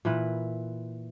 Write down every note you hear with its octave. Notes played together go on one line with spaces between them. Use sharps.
A#2 E3 B4